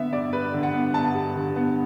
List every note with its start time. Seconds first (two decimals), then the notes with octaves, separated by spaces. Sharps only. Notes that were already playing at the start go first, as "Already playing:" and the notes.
Already playing: D3 B3 E5
0.13 G2 D5
0.33 G3 B4
0.54 D3
0.63 F#5
0.73 B3
0.94 G2 A5
1.15 G3
1.36 D3
1.56 B3